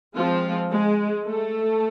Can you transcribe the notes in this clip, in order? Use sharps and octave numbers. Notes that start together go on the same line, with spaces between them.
F3 G#3 C4 F4
G#3 G#4
A3 A4